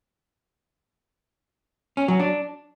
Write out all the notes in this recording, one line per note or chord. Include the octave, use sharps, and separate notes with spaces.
C#4
F#3
D4